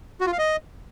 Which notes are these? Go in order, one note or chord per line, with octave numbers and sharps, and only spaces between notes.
F#4
F4
F5
D#5